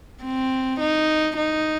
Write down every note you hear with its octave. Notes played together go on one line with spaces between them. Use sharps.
C4
D#4
D#4